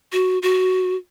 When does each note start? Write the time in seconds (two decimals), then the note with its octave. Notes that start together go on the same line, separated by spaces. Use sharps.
0.12 F#4
0.42 F#4